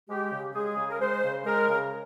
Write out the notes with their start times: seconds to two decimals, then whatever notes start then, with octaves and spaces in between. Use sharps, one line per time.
0.09 G#3 G4
0.32 C#3
0.54 G#3 G#4
0.77 C#3
0.89 A#4
1.00 G#3 C5
1.23 C#3
1.45 G#3 A#4
1.68 C#3